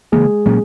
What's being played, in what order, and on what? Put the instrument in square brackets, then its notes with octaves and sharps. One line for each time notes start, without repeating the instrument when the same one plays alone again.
[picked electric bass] C#3 E3 A#3 [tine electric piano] G#3 G#4
[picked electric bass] A#2 F#3 A#3 C#4